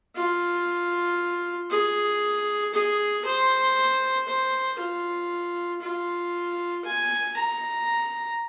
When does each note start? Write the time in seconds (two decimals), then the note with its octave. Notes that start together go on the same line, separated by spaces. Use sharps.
0.16 F4
1.70 G#4
2.73 G#4
3.24 C5
4.28 C5
4.79 F4
5.82 F4
6.85 G#5
7.37 A#5